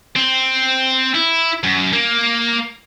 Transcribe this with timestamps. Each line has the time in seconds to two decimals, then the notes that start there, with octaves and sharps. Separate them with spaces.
0.16 C4
1.15 E4
1.63 F#2
1.93 A#3